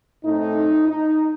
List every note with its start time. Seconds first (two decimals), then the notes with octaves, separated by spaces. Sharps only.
0.24 A2 A3 C4 D#4
0.88 D#4